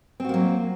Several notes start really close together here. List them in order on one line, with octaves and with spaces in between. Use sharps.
C4 F#4 A#3 F#3